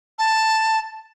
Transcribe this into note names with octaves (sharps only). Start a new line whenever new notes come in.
A5